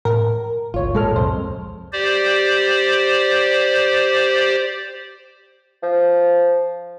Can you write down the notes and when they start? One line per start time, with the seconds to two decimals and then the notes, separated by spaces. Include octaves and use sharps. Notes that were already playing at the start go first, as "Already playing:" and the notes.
0.05 A2 A#4
0.74 G#1 D2 F4 C#5
0.95 G#1 A#2 G#3 A4 F6
1.16 C2 F2 C5
1.93 G4 C5 D5
5.83 F3